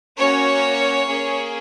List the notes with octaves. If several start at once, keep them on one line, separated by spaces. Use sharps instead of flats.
A#3 C#4 F#4 C#5
A#3 C#4 G#4